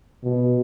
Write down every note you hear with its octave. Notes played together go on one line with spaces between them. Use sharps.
B2